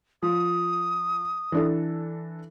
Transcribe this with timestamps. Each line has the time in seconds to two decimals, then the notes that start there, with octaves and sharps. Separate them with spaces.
0.23 F3 D#6
1.52 E3 D4 A4